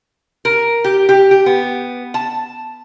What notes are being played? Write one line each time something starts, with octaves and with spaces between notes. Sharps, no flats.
A#4
G4
G4
G4
B3
A5